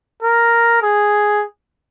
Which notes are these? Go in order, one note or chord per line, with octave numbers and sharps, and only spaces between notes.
A#4
G#4